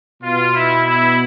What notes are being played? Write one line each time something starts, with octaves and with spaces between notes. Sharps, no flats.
B2 B3 F4
E4
E4